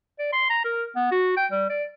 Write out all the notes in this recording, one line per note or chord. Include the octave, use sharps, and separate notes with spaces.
D5
C6
A#5
A#4
B3
F#4
G5
G3
D5